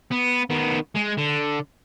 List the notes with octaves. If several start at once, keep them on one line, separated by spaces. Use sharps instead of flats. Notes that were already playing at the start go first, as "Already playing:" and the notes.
B3
D#3 B3
G#3
D3